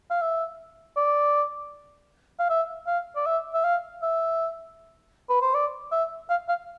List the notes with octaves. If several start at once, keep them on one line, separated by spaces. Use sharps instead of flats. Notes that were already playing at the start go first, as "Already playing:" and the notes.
F5
E5
D5
F5
E5
F5
D5
E5
E5
F5
E5
B4
C5
D5
E5
F5
F5